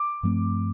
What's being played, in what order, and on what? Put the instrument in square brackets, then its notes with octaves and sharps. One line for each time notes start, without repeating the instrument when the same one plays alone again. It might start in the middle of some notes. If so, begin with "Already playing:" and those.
Already playing: [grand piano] D6
[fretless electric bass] G2 F3 A3 C4